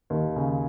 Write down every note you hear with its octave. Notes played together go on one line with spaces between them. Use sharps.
D#2
C#3